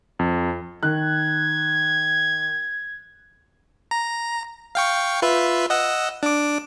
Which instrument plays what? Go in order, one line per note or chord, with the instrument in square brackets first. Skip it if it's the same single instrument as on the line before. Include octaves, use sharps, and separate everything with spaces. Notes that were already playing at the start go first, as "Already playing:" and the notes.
[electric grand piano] F2
[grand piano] D#3 F#6 [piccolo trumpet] G#6
[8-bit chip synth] A#5
F5 G5 C#6
F4 B4 E5
D#5 F#5 E6
D4 D6